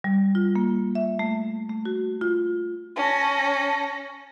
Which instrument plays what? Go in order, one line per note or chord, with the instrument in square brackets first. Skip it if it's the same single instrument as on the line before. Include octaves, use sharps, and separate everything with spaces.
[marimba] G3
F4
A#3
E5
A3
A3
F#4
F4
[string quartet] C#4 [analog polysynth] A5 A#6